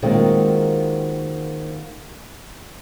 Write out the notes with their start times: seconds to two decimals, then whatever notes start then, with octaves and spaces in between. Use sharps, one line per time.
0.02 D#3 G#3 A#3 C4 F4 F#4